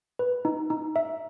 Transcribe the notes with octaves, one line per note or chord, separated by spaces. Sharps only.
B4
D#4
D#4
E5